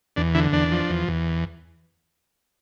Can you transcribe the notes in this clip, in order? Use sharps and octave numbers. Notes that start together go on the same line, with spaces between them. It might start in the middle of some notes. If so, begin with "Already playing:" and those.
E2 D4
D3 E4
E2 D4
F3
E2
E2